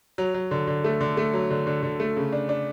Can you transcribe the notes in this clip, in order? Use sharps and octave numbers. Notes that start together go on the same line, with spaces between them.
F#3
F#3
D3
D3
A3
D3
A3
F#3
D3
D3
D3
A3
C#3
D4
D4